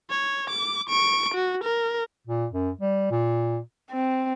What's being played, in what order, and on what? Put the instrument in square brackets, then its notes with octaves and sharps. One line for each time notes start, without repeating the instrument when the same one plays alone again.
[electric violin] C#5
D6
C#6 D7
F#4
A#4
[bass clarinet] A#2
F#2
G3
A#2
[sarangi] C4